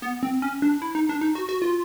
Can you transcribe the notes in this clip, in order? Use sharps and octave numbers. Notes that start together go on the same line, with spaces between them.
B3
C4
C#4
D4
E4
D#4
D4
D#4
F#4
F#4
F4